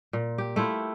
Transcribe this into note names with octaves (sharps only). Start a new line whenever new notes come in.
A#2
G4
A3 E4 F4